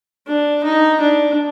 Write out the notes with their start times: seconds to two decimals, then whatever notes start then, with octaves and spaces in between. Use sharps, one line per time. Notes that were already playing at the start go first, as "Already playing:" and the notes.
0.27 D4
0.64 D#4
1.00 D4